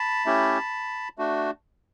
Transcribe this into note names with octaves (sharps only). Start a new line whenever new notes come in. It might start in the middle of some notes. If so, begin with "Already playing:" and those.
Already playing: A5 B5
A3 C#4 E4 G4
A3 D4 F#4